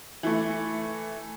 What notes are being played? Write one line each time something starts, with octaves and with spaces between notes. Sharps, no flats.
E3 A3